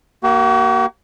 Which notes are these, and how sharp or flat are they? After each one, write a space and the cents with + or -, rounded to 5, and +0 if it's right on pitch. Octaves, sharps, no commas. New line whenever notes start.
A#3 +0 F#4 +45